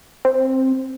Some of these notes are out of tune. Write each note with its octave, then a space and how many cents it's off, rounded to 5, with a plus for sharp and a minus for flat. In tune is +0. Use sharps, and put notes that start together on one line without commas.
C4 +10